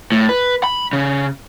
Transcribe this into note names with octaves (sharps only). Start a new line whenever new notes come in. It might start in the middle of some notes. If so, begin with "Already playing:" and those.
A2
B4
B5
C#3